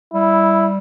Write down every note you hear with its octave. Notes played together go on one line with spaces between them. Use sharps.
G3 E4